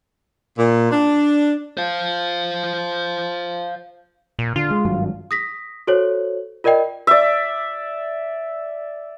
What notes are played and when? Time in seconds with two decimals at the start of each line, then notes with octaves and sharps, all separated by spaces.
0.58 A#2
0.92 D4
1.77 C5 F5
4.39 A#2
4.56 D3 F4
4.70 G#3
4.85 G#1 G2 F#3
5.31 D#6 A#6 B6
5.87 F#4 A4 C5 C#5
6.64 F4 A#4 D5 D#5 G5
7.07 D5 E5